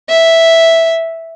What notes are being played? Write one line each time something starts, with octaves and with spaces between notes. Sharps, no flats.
E5